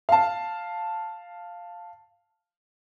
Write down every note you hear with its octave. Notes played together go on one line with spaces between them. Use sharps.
F5 A5